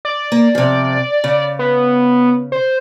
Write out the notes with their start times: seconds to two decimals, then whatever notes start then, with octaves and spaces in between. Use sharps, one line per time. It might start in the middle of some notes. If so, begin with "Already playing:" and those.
0.05 D5
0.32 A#3
0.55 C3 F3
1.24 C#3
1.59 B3
2.52 C5